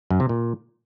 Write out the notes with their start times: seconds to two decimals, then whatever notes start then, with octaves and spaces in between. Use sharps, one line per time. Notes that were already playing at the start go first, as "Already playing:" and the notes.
0.10 F#2
0.20 C3
0.29 A#2